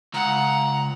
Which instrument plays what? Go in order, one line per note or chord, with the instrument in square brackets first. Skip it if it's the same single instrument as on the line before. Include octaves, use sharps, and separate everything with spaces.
[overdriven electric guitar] C#2 [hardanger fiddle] F#5 [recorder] A#5